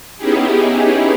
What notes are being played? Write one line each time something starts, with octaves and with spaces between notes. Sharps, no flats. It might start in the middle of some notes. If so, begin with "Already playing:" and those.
B3 C#4 D#4 E4 G4 G#4